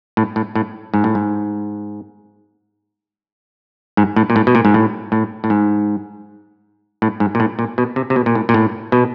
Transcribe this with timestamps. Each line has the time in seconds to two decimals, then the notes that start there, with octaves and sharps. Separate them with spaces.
0.17 A2
0.36 A2
0.55 A2
0.94 G#2
1.04 A2
1.15 G#2
3.97 G#2
4.16 A2
4.30 A#2
4.36 A2
4.47 B2
4.55 A#2
4.65 G#2
4.74 A2
5.12 A2
5.44 A2
5.50 G#2
7.02 A2
7.20 G#2
7.35 A#2
7.40 A2
7.59 A#2
7.78 B2
7.96 C3
8.10 C3
8.16 B2
8.26 A#2
8.35 A2
8.49 A#2
8.54 A2
8.92 B2